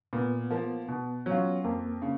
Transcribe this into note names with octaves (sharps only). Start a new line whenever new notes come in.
A#2 B3
F3 A#3
B2
F#3 C#4 F4
F2 A#3
C#3